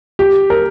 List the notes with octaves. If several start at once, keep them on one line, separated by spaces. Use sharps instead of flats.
G4
A#4